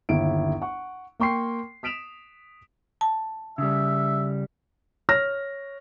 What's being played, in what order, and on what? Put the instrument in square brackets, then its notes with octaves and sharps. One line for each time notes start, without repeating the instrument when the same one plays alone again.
[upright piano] G1 D#2 E4 D7
F#5 C#6
A#3 G5 C6 C#6 C7
D#6 B6 D7 E7 F7
[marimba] A5
[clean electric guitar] C#3 G3 [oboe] E5
[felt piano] C#5 F6 A#6